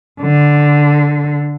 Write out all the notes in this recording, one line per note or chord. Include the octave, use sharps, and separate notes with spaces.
D3